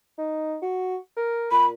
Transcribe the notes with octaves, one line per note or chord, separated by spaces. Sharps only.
D#4
F#4
A#4
A#2 B5